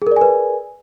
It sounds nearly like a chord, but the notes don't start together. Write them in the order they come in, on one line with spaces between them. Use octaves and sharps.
G#4 A#4 D5 G#5 B4